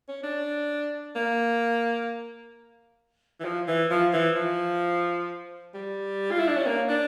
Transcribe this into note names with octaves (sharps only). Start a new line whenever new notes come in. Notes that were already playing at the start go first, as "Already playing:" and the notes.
C#4
D4
A#3
E3
F3
E3
F3
E3
F3
G3
F4
E4
D4
C#4
A#3
D4